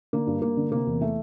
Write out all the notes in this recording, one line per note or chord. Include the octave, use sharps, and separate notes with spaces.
D3 A#3
G2
G2 A#3
D3
C3 A#3
E2
E3 A3